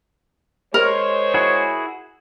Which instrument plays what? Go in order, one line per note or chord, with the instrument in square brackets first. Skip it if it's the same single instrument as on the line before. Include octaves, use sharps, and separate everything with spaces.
[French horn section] G#3 C5 C#5 [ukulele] A#4
[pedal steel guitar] E4 F#4 G#4